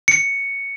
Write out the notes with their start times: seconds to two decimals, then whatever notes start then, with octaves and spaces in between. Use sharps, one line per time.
0.08 C#7